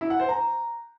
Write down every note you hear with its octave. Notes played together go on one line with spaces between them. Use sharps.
E4
F#5
C5
A#5